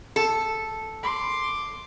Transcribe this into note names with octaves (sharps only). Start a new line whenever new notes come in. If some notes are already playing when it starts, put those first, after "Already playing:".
A4
C6 D6